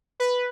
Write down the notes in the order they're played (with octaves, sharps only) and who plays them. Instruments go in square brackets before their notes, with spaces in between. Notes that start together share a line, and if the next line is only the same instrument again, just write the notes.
[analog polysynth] B4